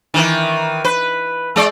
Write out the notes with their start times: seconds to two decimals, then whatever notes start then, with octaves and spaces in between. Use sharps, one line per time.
0.14 D#3 E3
0.84 B4
1.56 G#3 D5